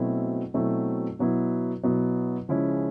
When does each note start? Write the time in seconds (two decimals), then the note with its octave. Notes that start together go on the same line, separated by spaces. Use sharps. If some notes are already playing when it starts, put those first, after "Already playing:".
Already playing: B2 F#3 A3 C4 E4
0.54 B2 F#3 A3 C4 E4
1.19 B2 F#3 B3 E4
1.83 B2 F#3 B3 E4
2.49 C#3 F3 G#3 C#4 E4